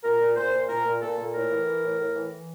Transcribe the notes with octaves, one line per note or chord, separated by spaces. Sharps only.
A#2 A#4
A#2
A#2 C5
A#2
A#2 A#4
A#2
A#2 A4
A#2
A2 A#4
E3
E3
A2
A2
E3
E3